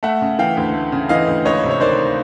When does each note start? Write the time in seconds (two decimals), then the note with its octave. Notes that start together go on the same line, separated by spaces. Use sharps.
0.03 A3 E5 F#5
0.22 C#3
0.39 E3 F5 G5
0.57 D2
0.74 A3
0.92 C#3
1.09 E3 D#5 F5
1.27 D2
1.45 C#2 C#5 D#5
1.64 C3
1.71 C#5
1.80 D#3 C5 D5